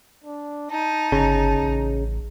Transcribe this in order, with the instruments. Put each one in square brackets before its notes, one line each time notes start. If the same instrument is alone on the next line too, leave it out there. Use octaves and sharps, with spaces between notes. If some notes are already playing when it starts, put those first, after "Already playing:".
[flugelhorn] D4
[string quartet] D#4 [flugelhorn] A5
[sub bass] G1 [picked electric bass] C#3
[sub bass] A1